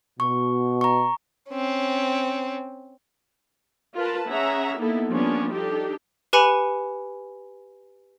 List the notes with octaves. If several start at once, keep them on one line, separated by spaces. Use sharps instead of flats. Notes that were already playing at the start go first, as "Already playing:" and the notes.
B2 C#6
A#5 C#6
C4 C#4
F4 A#4 B4 A5
C#4 G#4 E5 F#5 A#5
A#3 B3 D#4 E4 A4
F3 G3 A#3 B3 C#4 D4
D4 D#4 G4 A4
G4 B4 G#5 B5 C#7 D#7